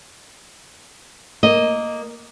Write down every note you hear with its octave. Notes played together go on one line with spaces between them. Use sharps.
A#3 D#5